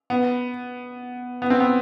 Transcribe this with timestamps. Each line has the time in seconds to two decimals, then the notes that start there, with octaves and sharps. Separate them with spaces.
0.10 B3
1.42 B3
1.50 C4
1.60 B3